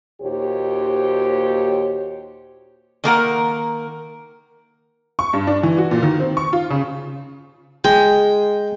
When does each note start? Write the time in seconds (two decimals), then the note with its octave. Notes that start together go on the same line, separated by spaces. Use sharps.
0.22 D#2 A#2 F#4 G4 C5 C#5
3.04 D#3 A#3 A#4 F#5
5.19 C#6
5.33 G2
5.47 D4
5.63 E3
5.78 F#4
5.91 A#2
6.02 D#3
6.20 C4
6.37 C#6
6.53 F4
6.70 C#3
7.84 G#3 G5